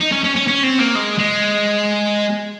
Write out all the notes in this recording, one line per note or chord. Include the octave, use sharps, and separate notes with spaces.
D#4
C#4
C#4
C#4
C#4
C4
A#3
G#3
G#3